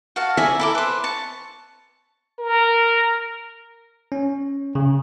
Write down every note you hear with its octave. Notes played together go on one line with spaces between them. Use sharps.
F#4 F5 A5
D5 E5 G#5 A#5
E4 A4 D6
B4 C5
A5 C#6
A#4
C#4
C#3